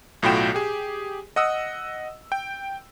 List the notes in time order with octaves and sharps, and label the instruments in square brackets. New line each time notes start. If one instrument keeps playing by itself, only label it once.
[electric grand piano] B1 A2 F4 F#4 G5 E7
G4 G#4
D#5 F#5 D#6 E6
G5